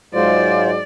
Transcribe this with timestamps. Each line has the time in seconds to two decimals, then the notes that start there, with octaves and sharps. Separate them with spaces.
0.14 G#2 F#3 G#3 F4 C5 D5